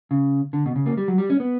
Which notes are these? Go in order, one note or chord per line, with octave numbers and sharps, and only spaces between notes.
C#3
D3
B2
C#3
A#3
G3
F#3
G3
C#4
B3